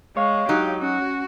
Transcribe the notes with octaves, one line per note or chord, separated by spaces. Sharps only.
G#3 C#5 F5
F#3 D#4 G4
C#4 F#4